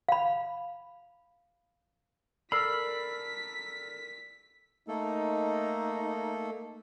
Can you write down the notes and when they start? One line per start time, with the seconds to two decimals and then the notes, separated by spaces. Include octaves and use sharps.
0.09 F5 B5
2.52 A4 A#4 D5 B5 E6 F6 B6 C7
4.88 A3 A#3 D#4 A4